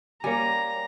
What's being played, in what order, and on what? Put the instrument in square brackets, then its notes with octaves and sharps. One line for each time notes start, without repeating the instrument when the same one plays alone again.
[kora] G3 A#3 [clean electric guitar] C#5 G#5 [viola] A#5